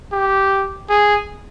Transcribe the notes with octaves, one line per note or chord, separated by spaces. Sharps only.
G4
G#4